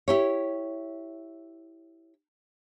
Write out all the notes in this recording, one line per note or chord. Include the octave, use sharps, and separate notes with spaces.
E4 G4 C#5